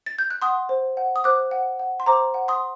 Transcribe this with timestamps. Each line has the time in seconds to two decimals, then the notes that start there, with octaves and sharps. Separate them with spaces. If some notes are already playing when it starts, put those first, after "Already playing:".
0.06 A6
0.19 G6
0.30 F#6
0.42 F#5 C6 D#6
0.69 C5
0.97 F#5
1.16 D#6
1.24 C5 D6 F#6
1.51 F#5
1.79 F#5
2.00 C6
2.06 C5 A#5 D6
2.34 F#5
2.48 C6 D#6